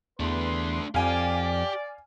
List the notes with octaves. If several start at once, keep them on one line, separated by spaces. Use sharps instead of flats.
E2 A3 D4 B4 C6
F2 G4 D5 F5 G#5